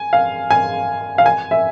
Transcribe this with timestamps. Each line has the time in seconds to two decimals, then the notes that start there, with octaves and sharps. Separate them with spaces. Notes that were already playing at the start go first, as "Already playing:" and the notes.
Already playing: G#5
0.13 F5
0.50 G#5
1.18 F5
1.26 G#5
1.51 E5